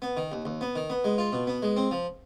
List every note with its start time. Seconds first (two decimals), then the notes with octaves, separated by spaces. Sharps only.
0.02 B3
0.17 D#3
0.32 D#2
0.45 D#2
0.61 B3
0.76 D#3
0.90 B3
1.04 G#3
1.18 F4
1.32 B2
1.47 B3
1.62 G#3
1.76 C4
1.91 F3